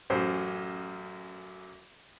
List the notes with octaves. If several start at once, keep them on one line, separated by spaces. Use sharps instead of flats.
A1 F#2 C5